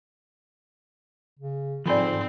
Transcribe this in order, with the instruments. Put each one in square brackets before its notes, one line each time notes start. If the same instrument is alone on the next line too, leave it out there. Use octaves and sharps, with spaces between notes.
[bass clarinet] C#3
[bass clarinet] G#2 [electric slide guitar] F3 A4 [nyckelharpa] C4 [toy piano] D5 G#5 B5